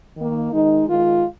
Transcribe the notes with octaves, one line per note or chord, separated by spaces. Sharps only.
D#3 A#3
D#3 G#3 D#4
D#3 G#3 F4